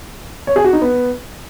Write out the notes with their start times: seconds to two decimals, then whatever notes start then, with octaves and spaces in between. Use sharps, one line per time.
0.47 C#5
0.56 G#4
0.64 F#4
0.73 D#4
0.82 B3